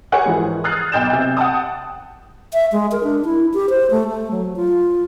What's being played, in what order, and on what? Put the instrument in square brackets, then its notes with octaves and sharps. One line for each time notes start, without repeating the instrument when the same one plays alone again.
[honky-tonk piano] G4 G#4 A#4 C#5 F#5 G#5
G#2 E3 F3 G#3
D#6 F6 F#6 G#6 A6 C7
B1 G5 G6 A6 E7
C3
F#5 G5 A5 D#6
[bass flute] E5
G#3
A#4
D4
E4
G4
C5
A3
A3
F#3
F4